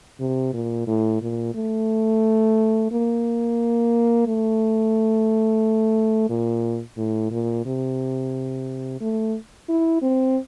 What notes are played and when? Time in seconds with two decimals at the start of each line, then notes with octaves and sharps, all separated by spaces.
0.20 C3
0.53 A#2
0.87 A2
1.22 A#2
1.55 A3
2.91 A#3
4.27 A3
6.29 A#2
6.97 A2
7.31 A#2
7.66 C3
9.01 A3
9.69 E4
10.02 C4